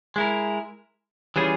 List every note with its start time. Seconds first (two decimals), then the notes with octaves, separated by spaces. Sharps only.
0.16 G#3 E4 A#4
1.36 E3 G3 C#4 F4 G#4